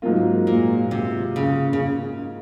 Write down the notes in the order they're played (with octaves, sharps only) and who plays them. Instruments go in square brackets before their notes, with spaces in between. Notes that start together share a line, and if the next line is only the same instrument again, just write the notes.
[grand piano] G#2 F#3 A#3 F4
[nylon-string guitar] A#2
C3
C#3
C#3